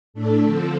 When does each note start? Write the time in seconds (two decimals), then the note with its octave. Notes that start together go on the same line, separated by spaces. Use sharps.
0.14 A2 A3 D4 A4
0.43 D3 F3 C4